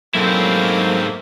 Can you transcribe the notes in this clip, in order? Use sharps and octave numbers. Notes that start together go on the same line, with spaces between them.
G#2 F#3 A3 A#3 C4 E4